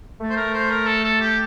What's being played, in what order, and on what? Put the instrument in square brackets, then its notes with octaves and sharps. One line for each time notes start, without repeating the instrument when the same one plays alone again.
[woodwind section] A3
[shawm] C5
A#4
C5
A#4
A4
A4
G4